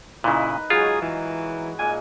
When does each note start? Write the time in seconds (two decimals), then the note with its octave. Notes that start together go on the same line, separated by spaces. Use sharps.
0.24 A#2 C#3 D#4 E4 A#4 B4
0.70 F#3 G#3 F4 G#4 C#5
1.02 E3
1.79 A#2 G#3 G#5